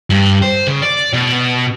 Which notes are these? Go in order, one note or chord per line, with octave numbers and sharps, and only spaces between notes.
G2
C5
C#3
D5
B2